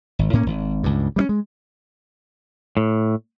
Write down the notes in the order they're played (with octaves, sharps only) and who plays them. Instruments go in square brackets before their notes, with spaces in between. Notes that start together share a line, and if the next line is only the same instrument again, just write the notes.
[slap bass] G#1
A2 A#3 C#4
G#1
C#2 G2
G3 A3 C#4
G#3
[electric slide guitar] A2